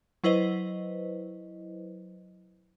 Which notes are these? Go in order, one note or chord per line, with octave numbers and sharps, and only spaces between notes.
F#3 E4 B4 C5 D#5